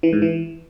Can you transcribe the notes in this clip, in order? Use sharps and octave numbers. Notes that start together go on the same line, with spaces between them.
E3
G#2
E3